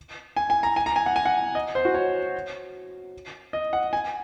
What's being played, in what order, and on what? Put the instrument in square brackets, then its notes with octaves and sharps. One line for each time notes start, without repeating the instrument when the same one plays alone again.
[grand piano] G#5
G#5
A#5
G#5
A#5
G#5
F#5
G#5
F#5
D#5
C5
F#4
C#5
D#5
F#5
G#5